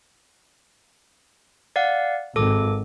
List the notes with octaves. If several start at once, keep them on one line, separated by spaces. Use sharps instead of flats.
D5 F5 F#5
G#1 A4 D6